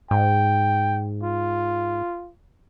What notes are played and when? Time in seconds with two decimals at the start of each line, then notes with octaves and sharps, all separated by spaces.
0.11 G#2 G5
1.23 F4